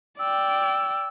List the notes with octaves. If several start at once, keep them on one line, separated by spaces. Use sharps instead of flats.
D5 G5 E6